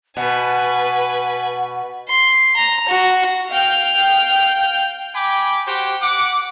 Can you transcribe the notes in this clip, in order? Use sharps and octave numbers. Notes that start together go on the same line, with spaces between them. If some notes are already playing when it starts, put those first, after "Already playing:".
B2 B4 F#5 G#5
C6
A#5
F#4
F5 G5 F6 G6
G5 G#5 B5 D6
F#4 G4 C5 G5
F#5 D6